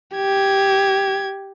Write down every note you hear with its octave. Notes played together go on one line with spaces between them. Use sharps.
G4 G#6